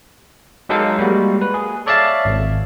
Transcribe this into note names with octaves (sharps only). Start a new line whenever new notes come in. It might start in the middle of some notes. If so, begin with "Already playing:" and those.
F#3 G#3 D#4 A4 A#4 F5
G3 G#3 A#3 F#4
B4
G#4
A4 C#5 D5 E5 F5 A5
G#1